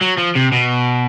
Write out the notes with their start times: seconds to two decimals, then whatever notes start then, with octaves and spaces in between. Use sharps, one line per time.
0.01 F#3
0.17 F3
0.35 C3
0.52 B2